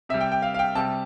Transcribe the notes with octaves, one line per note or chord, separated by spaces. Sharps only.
C3 G3 E5
G5
G5
F5
F5
G5
C3 G3 A5